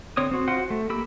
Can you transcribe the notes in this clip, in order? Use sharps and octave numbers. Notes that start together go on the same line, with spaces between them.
D3 C4 C#5 D#6
C4 F#4
F4 F#4 C5 F#5
A3
A#3 G4 B5 E6